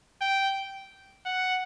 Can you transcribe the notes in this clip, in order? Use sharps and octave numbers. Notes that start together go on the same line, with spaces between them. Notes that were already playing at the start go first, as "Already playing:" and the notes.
G5
F#5